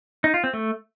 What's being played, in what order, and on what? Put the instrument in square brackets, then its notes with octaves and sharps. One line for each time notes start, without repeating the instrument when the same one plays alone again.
[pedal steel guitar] D#4
F4
C4
A3